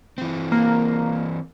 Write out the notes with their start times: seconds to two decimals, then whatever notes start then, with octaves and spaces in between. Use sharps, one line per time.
0.18 E3 C4
0.52 A#3